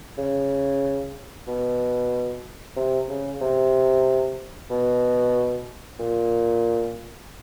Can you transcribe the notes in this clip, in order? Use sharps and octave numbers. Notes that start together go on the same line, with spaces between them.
C#3
B2
C3
C#3
C3
B2
A#2